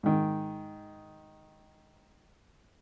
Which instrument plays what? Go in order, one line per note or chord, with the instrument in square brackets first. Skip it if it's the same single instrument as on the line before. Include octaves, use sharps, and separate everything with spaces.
[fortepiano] G#2 D#3